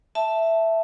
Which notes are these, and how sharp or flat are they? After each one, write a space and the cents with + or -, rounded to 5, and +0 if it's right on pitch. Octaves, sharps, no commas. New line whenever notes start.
E5 +0 A5 +0